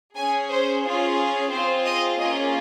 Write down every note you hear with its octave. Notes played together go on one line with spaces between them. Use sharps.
C#4 G#4 G#5
C5
C#4 F4 G#4
C4 F4 G#4 C5
D#5
A#3 C#4 F4 G#4 D#5